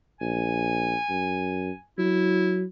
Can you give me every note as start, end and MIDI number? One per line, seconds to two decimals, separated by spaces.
0.21 0.95 34
0.21 1.83 80
1.10 1.71 42
1.98 2.64 54
1.98 2.64 64